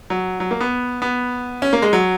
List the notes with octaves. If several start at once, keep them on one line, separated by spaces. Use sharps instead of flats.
F#3
F#3
A#3
B3
B3
C#4
A#3
G#3
F#3